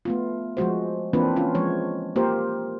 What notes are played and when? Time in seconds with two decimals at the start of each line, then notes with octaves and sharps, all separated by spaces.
0.05 A3 B3 F4
0.57 F3 G#3 F#4 C5
1.13 E3 A#3 C4 D4 F4 B4
1.36 C#4 F4
1.55 F3 G#3 C#5
2.16 A#3 F4 G4 A#4 C5